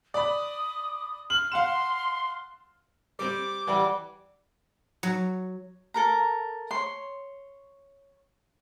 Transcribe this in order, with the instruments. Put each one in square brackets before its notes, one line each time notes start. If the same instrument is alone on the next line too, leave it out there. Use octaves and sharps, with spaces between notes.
[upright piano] D5 B5 [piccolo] D#6
[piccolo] F6 [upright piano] F#7
[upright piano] F5 F#5 E7 [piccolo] C6
[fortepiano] G3 C4 [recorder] D6
[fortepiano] E3 F#5 [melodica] G3
[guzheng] F#3
[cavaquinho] A4 A#4 A#5
C#5 C6